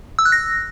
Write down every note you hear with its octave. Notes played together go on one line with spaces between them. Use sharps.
E6
F#6
A#6